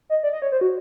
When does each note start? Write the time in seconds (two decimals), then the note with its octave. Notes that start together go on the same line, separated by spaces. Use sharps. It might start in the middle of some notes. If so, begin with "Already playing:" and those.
0.10 D#5
0.23 D5
0.33 D#5
0.42 C#5
0.52 C5
0.61 F#4